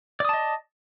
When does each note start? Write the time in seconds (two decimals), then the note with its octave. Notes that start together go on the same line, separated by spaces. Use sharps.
0.20 D5
0.25 D#6
0.29 A5
0.33 D#5